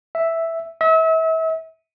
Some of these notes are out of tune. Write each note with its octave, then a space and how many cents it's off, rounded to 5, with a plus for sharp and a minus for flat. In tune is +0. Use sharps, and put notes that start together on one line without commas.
E5 +0
E5 -35